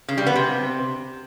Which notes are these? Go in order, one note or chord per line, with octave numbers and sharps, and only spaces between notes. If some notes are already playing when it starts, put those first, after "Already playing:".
C#3
G3
B3
C3